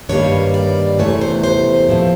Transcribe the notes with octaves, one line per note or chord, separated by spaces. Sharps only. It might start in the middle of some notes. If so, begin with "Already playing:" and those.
G2 D#3 G3 A#3 C#5
D5
E2 C3 E3 A3 C#5
C5
C5
A2 F3 A3